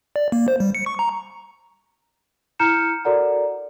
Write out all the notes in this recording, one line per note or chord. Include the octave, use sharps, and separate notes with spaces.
D5
A#3
C5
G3
C#7
C#6
A#5
E4 A#5 F6 G6 C#7 E7
F#4 A4 A#4 D5 F#5 A#5